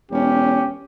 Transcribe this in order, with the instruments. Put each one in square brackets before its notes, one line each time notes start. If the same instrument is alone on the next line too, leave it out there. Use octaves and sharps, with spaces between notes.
[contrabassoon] E1 [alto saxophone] C#4 [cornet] G4